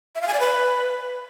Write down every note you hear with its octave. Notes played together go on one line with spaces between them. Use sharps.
E5
F5
G#5
D5
B4